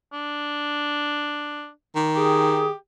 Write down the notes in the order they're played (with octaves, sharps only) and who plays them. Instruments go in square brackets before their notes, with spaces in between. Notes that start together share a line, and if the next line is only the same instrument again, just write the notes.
[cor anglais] D4
[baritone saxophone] D#3 [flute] D6
[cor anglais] G4 [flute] G#4